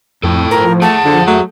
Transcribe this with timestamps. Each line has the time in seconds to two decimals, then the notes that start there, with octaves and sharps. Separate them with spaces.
0.23 F2 A2 A4 G5
0.51 F3 A#4
0.82 A3 G#4 F#5 A5
1.05 D3 F3
1.27 F#3 A3